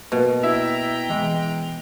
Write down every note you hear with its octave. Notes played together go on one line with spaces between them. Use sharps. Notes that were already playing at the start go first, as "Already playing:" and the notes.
B2 A#3
E4 E5 G5 A#5
E3 G#3